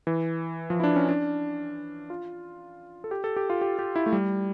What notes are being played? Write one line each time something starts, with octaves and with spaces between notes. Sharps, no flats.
E3
F3
E4
D4
C#4
D4
F4
A4
G4
A4
G4
F4
G4
G4
E4
A3
G3